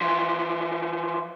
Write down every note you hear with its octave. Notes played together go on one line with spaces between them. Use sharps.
E3 F3